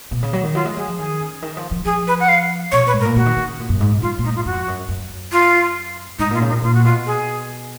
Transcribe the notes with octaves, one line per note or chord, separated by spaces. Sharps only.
B2
C#3
F#3
D#3
F#3 F4
G#3
F#3 G#4
F3
D#3 G#4
C#3
D#3
F3
F3
F3 G#4
B4
F#5
F5
B2 C#5
A#2 B4
G#2
A#4
A#2
C#3 F#4
D#3
D#3
C#3
A#2
F#2
G#2
B2
F#2 F4
A#2
G#2 D#4
F4
F2 F#4
F#2
F#2
F4
G#2 D#4
A#2 F4
C#3
D#4
A#2
A#2 F4
F#4
B2 F4
G#4